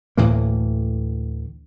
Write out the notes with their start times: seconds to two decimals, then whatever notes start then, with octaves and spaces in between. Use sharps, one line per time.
0.17 D2 A2 E3 A#3